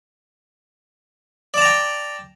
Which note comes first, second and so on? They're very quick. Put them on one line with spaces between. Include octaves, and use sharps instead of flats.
D5 A5 A#5 G5